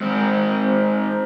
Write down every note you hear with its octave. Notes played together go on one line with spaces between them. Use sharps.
G#2 C4